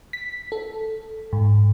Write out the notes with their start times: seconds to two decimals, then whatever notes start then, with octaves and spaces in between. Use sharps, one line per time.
0.13 B6
0.52 A4
1.33 G#2